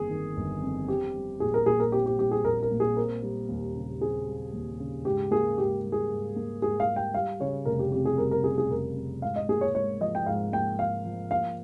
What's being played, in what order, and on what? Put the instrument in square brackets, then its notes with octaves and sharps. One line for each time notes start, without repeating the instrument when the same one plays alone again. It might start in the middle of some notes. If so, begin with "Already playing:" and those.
Already playing: [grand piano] G1 F2 D#3 A#3 [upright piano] G#4
[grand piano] D#3
G1
F2
[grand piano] C4 [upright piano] G4
[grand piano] G3
[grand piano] A#1 [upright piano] G#4
[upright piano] A#4
[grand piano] A#2 [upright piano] G#4
[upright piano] A#4
[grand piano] C4 [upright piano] G4
[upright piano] G4
[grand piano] G3 [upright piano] G4
[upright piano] G#4
[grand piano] A#1 [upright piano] A#4
[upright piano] A#4
[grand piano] A#2
[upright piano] G#4
[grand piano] C4 [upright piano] A#4
[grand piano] G3
D#2
C#3
[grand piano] C4 [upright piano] G#4
[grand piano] G3
D#2
C#3
[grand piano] G#2 [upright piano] G4
[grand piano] A#3 [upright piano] G#4
[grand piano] G#2 [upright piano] G4
[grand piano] G3
[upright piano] G#4
[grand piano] G#2
A#3
[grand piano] G#2 [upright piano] G#4
[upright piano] F5
[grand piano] G3
[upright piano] G5
[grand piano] G3 [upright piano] F5
[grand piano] C#3 [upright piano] C#5
[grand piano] F1 [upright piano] A#4
[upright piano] G4
[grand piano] F2 [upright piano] G4
[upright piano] G#4
[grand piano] G3 [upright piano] A#4
[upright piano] A#4
[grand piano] C#3 [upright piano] G#4
[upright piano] G#4
[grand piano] F1 [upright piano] A#4
[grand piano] F2
[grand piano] G#2 [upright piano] F5
[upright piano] D#5
[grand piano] A#3 [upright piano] G#4
[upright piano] C#5
[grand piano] G#2 [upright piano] C#5
[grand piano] F3 [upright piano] D#5
[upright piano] G5
[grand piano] G#2 [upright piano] F5
[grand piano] A#3 [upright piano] G5
[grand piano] G#2 [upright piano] F5
[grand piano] F3
[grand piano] A#3 [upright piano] F5